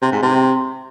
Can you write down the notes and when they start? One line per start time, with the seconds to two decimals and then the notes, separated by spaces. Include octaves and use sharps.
0.02 C3
0.12 G#2
0.22 C3